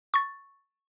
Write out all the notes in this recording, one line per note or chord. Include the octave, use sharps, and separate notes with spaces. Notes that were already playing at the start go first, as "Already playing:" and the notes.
C#6 A6